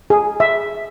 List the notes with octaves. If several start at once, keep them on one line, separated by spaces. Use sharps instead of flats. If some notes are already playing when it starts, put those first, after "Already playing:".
G#4
E5